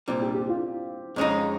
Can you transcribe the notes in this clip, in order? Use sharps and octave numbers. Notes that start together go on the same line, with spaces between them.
C2 A#2 G3 C4
G4
G4
F4
F2 C#3 G#3 D#4